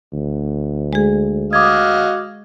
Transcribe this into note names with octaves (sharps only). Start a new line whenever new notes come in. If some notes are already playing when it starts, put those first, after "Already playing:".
D2
G#3 G#4
F#4 D#5 F5 D6 D#6 G#6